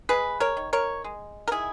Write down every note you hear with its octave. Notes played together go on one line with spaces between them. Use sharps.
G#3 G#4 B4
A#4 C#5
D#3
A#4 C#5
G#3
A#4
D#3 E4 G#4